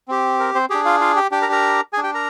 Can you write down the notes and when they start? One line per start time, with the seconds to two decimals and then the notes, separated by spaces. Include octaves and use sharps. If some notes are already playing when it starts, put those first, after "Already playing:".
0.08 C4 G4
0.40 A#4
0.55 C4 C5
0.70 D4 G4 G#4 G5
0.85 F4 F5
1.01 F4 F5
1.16 G4 G5
1.31 D4 G4 G5
1.42 A#4 A#5
1.52 A#4 A#5
1.93 G#4 G#5
1.98 D4
2.03 G4 G5
2.14 A#4 A#5